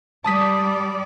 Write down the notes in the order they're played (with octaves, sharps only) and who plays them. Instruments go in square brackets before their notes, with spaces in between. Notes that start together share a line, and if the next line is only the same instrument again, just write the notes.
[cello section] G3 D5 [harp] A5 D#6 B6